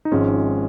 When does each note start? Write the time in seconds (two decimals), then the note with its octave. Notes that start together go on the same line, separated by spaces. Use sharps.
0.05 D#4
0.12 G#1 G#2 F3 G#3 C#4